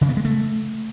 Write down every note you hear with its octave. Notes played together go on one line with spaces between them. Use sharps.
C#3
B3
G#3
A3